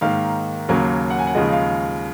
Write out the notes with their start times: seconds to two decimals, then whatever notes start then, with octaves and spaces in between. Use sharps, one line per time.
0.01 G#2 D#3 A#3 F5
0.69 D#2 C#3 F#3 A#3 C#4
1.10 F#5
1.19 G#5
1.27 F#5
1.35 D#2 C#3 F3 G#3 D#5
1.52 F5